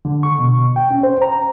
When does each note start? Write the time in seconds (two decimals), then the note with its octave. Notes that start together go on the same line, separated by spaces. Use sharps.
0.05 D3
0.23 C#6
0.38 B2
0.76 G5
0.91 C#4
1.03 C5
1.22 A#5